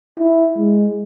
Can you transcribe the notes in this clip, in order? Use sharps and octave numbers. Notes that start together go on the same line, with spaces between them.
E4
G#3